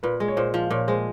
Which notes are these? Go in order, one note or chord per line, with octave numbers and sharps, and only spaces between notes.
A#2 B4
G#3
C#5
A#2 C5
F3
A#2 C#5
G#3 C5